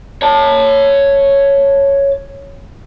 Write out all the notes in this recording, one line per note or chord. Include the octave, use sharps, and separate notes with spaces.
C#5 A5